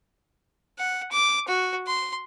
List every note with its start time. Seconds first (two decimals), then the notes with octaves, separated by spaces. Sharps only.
0.78 F#5
1.12 D6
1.48 F#4
1.87 C6